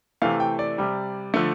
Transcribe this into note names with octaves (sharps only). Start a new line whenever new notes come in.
C3 E3 A3 F5
G5
D5
C3 G3
D3 F3 A3